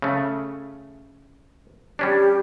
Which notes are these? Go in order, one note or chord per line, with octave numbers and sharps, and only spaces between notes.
C#3 A3
G3 C#4 D4 G4